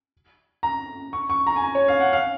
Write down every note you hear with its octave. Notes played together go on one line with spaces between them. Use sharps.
A#5
C#6
C#6
A#5
G#5
A#5
C#5
F5
F#5
F5